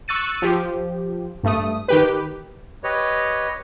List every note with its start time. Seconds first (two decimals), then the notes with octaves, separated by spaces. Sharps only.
0.08 C#6 E6 F#6 A6 C#7 D#7
0.42 F3 G4
1.44 G2 A3 D#6
1.88 D#3 G4 B4
2.84 G4 B4 C#5 D#5